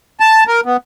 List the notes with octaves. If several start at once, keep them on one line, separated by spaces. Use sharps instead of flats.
A5
A#4
B3